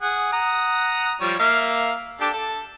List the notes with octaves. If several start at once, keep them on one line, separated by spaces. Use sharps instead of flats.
G#4 F#5
F#5 A#5 D#6
F3 G3 C#5
A#3 E5 F5
D4 G4 A4
A4